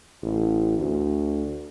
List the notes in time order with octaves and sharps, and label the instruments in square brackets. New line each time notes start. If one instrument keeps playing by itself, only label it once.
[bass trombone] A1
D2